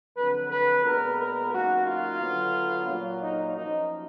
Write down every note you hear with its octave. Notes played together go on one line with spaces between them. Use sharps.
F2 D3 F#3 B4
B4
A#2 G#3 B3 A#4
A#4
F#2 D#3 A#3 F#4
F4
D3 F#3 B3
A#2 F#3 A#3
D#4
F#2 F3 A#3 D#4